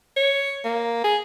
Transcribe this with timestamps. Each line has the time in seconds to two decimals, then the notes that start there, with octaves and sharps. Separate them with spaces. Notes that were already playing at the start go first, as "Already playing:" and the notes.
0.16 C#5
0.64 A#3
1.04 G#4